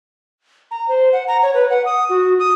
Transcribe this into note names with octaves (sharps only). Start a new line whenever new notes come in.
A#5
C5
F#5
A#5
C#5
B4
F#5
D#6
F#4
D#6